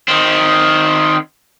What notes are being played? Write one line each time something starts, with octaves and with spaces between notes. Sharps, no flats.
D#3 C4